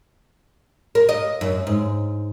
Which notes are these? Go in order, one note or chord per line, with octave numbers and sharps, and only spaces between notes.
A#4
D#5
F#2
G#2